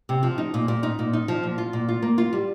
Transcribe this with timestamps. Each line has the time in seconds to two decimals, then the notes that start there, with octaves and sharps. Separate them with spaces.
0.09 C3
0.23 F3
0.38 D#4
0.54 A#2
0.68 A#2
0.83 D#4
0.99 A#2
1.13 D#4
1.28 F3
1.43 A#2
1.58 F4
1.73 A#2
1.89 F4
2.02 A#3
2.18 F4
2.33 G3